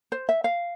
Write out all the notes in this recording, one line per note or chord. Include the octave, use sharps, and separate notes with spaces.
C5
E5
F5